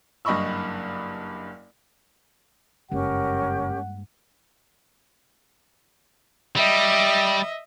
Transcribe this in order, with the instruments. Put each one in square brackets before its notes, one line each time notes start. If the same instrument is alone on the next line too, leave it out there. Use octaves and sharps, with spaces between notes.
[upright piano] F#1 G2 D#5 B5 C#6 E6
[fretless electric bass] F#1 [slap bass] G2 G#3 A#3 [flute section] C#4 G4 A#4 [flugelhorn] F#5
[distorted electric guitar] G3 [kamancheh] D#5 E5